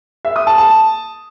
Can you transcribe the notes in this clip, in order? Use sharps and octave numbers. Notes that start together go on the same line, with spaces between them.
E5
D#6
A5
A5